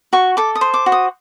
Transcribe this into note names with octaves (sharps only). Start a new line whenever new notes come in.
F#4 C#6
A4 D6
D#6
C5
D6
F#4
D#6